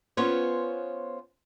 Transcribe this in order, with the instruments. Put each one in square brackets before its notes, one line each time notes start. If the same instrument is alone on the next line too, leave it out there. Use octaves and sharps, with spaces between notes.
[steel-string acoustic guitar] B3 C#4 F4 C5 C#5